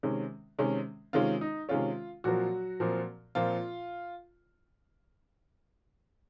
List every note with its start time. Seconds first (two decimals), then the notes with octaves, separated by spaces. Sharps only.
0.03 C3 D#3 G#3 C#4
0.59 C3 D#3 G#3 C#4
1.13 C3 D#3 G#3 C#4 F4
1.41 D#4
1.69 C3 D#3 G#3 C#4 F4
2.24 A#2 F3 F#3 C4 F#4
2.80 A#2 F3 C4
3.35 A#2 F3 C4 F4